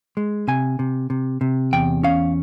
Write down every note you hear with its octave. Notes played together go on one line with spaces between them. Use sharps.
G#3
C3 G#5
C3
C3
C3
E2 G5
C#4 F5